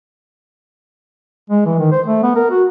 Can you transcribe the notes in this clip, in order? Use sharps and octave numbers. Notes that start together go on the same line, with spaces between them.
G#3
E3
D#3
C5
A3
B3
A#4
F#4